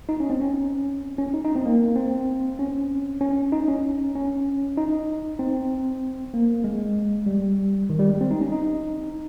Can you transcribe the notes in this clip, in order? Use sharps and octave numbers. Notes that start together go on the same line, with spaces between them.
D#4
C#4
C4
C#4
C#4
D#4
D#4
C4
A#3
C4
C#4
C#4
D#4
C#4
C#4
D#4
C4
A#3
G#3
G3
D#3
G3
G#3
C4
D#4
C#4
D#4